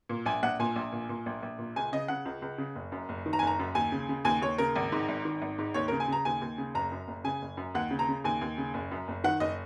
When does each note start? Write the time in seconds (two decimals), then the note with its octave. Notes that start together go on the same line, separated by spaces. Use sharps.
0.09 A#2
0.26 A#1 G#5
0.43 A#1 F#5
0.59 A#2 G#5
0.76 A#1
0.92 A#2
1.09 A#2
1.26 A#1
1.42 A#1
1.58 A#2
1.76 C#2 G#5
1.93 C#3 D#5
2.08 C#3 F#5
2.25 C#2
2.42 C#2
2.58 C#3
2.76 F#1
2.92 F#2
3.09 F#1
3.26 D#3
3.33 A#5
3.39 G#5
3.42 F#1
3.47 A#5
3.59 F#2
3.75 D#2 G#5
3.92 C#3
4.09 C#3
4.25 D#2 G#5
4.42 D#2 C#5
4.58 C#3 A#4
4.76 G#1
4.92 G#2
5.08 G#1
5.25 D#3
5.42 G#1
5.58 G#2
5.74 D#2 C#5
5.88 C#3 A#4
6.00 G#5
6.08 C#3 A#5
6.25 D#2 G#5
6.41 D#2
6.58 C#3
6.75 F#1 A#5
6.92 F#2
7.08 F#1
7.24 C#3 G#5
7.42 F#1
7.57 F#2
7.75 D#2 F#5
7.91 C#3
7.99 A#5
8.08 C#3
8.24 D#2 G#5
8.41 D#2
8.58 C#3
8.74 F#1
8.91 F#2
9.08 F#1
9.24 D#3 F#5
9.40 F#1 D#5